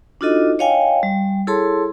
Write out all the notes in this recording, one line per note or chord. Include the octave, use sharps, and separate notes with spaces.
D4 D#4 F4 F#4 A4 D#5
C#5 D#5 F5 G5 G#5
G3
E4 G#4 A4 C#5 A5 C6